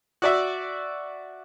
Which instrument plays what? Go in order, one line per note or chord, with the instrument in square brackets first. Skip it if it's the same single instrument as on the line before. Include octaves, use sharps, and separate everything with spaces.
[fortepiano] F#4 D5 E5